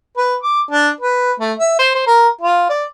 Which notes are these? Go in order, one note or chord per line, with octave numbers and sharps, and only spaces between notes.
B4
D6
D4
B4
A3
E5
C5
C5
A#4
F4
D5